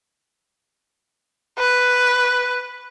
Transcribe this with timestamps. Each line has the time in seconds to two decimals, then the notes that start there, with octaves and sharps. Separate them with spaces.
1.59 B4